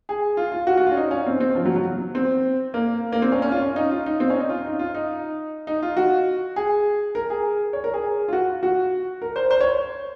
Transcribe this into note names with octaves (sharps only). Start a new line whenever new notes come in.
G#4
F4
F4
F#4
F#4
F4
C#4
D#4
C#4
C4
C4
F3
F#3
F#3
C4
A#3
A#3
C4
C#4
C#4
F4
C#4
D#4
F4
D#4
C4
C#4
D#4
F4
D#4
F4
D#4
D#4
F4
F#4
G#4
A#4
G#4
C#5
A#4
G#4
F4
F#4
F#4
A#4
C5
C5
C#5